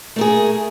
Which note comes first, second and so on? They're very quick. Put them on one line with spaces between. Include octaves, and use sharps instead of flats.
A3 A#4 G#4